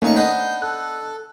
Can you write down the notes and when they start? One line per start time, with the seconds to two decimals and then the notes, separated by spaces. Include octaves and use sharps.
0.02 D#2 A3 A#3 C#4 D#4 C#6
0.16 B3 D4 C5 D#5 G6
0.62 A4 F#6